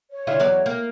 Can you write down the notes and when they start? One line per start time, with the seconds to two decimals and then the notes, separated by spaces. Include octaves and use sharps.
0.11 C#5
0.27 D3 E4 F4
0.39 E2 F#3 D5
0.66 A#3